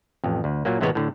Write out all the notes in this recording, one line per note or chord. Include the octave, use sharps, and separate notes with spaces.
A1 F2
D2
A#2 F#3 A#3
A1 C3 E3 G#3 B3 C#5
A2 D3